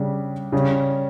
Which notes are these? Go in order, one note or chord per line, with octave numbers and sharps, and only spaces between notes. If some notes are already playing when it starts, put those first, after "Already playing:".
Already playing: C#3 G3 D4
C#3 G3 C#4